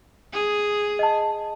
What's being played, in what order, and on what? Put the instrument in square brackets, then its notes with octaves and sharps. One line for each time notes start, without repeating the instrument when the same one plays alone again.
[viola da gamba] G#4
[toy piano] D#5 A5